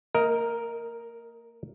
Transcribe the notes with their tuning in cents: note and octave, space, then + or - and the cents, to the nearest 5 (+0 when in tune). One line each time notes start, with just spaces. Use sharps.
A#3 -35 A#4 +0 D#5 +20